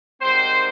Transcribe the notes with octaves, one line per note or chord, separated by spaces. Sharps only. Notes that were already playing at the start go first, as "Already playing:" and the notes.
G#2 D#3 G3 C4 C5